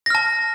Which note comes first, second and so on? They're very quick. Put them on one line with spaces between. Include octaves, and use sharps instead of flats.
A#6 F6 A5